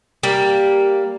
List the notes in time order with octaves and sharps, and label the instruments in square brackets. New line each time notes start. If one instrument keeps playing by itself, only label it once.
[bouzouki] G3 A#3